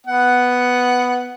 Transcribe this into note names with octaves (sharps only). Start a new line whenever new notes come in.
B3 F#5